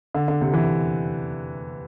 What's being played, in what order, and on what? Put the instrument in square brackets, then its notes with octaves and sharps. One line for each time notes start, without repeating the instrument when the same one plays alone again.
[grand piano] D3
D3
C3
E3